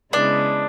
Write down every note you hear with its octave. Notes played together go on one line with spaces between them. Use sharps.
C#3 G#3 B3 D4 E4